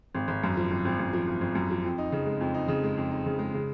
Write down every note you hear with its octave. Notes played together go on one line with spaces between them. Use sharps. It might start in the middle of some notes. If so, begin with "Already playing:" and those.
G#1
G#1
F#2
F3
G#1
G#1
F#2
F3
G#1
G#1
F#2
F3
F2
D#4
C#3
G#3
F2
D#4
C#3
G#3
F2
D#4
C#3
G#3
C#3